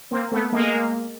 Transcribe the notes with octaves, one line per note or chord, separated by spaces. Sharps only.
A#3 C4
A3 B3
G#3 A#3